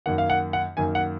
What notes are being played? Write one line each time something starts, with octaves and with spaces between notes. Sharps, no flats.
F#2 D#3 A#3 F#5
F5
F#5
F#5
F#2 D#3 A#3 G#5
F#5